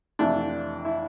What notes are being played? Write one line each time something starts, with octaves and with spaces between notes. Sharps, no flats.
F2 C3 E3 A3 D4
E4